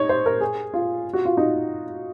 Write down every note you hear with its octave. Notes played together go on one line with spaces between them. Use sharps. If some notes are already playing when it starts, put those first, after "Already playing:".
Already playing: D#4 C#5
C5
A#4
G#4
F4
F#4
F4
D#4